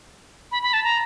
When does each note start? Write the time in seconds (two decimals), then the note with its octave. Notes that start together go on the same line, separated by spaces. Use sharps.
0.52 B5
0.63 B5
0.73 A5
0.84 A#5